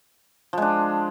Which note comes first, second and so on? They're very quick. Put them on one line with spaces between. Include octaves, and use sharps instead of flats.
F3 G#3 D4